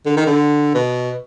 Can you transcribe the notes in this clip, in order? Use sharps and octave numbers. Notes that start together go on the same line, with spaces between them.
D3
D#3
D3
B2